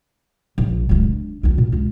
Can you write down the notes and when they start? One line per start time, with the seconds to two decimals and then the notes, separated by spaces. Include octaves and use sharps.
0.58 A#1
0.89 D1 C#2
1.04 D4
1.43 D2 F4
1.58 A#2
1.72 C#2 F4